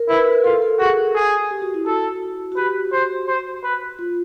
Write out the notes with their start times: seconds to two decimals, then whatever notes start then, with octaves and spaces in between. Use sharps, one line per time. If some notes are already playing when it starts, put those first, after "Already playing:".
Already playing: A#4
0.09 E4 B4
0.20 A#4
0.32 A#4
0.44 F4 A4
0.62 A4
0.79 F#4 G#4
1.15 G#4
1.51 G4
1.62 F#4
1.74 E4
1.86 F#4 A4
2.52 F#4
2.57 G4 B4
2.92 C5
3.28 C5
3.64 B4
3.99 F4